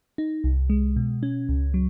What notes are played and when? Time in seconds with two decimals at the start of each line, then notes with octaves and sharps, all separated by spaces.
0.18 D#4
0.44 C2
0.70 G#3
0.96 B2
1.23 C#4
1.49 C#2
1.74 F#3